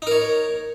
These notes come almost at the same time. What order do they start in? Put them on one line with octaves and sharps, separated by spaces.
D#4 A#4 C#5